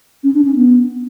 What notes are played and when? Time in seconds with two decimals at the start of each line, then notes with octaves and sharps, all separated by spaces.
0.24 C#4
0.34 D4
0.45 C#4
0.56 B3